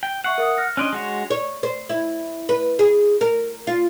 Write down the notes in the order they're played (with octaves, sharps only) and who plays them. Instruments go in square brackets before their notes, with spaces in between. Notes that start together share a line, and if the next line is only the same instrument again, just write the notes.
[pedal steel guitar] G5
[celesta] E5 C#6 C7 [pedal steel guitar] F#5
[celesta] A#4 E5 D#6
F6 A#6 C#7
[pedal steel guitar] C#4 D5 D#5 [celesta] D4 C6 F#6
[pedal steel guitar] G#3 F#4 C#5
[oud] C#5
C5
E4
B4
G#4
A#4
F4